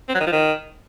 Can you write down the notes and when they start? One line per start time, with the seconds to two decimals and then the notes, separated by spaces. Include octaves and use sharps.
0.09 C4
0.15 F#3
0.21 D#3
0.27 F3
0.33 D#3